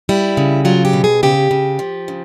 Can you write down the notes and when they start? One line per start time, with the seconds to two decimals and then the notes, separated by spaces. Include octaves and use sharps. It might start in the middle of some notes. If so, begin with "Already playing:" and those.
0.09 G3 E4
0.37 C#3
0.65 F#3 F4
0.85 G4
0.93 B2
1.04 G#4
1.23 C#3 G4
1.51 C#3
1.79 F3
2.08 C#3